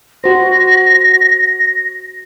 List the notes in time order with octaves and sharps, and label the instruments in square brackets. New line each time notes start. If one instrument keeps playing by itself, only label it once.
[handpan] F#4 C5 [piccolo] A#6